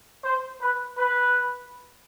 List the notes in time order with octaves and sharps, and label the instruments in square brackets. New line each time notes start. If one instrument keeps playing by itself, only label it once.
[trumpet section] C5
B4
B4